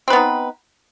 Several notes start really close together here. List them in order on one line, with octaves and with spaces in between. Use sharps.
C4 B4 B3 D#4